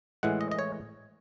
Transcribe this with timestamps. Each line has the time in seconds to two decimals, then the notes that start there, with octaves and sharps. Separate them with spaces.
0.23 A2 E3 G#3 F#5
0.41 D#5
0.51 D#5
0.59 C#5